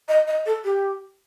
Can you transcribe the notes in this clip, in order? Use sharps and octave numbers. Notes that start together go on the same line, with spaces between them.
D#5
D#5
A4
G4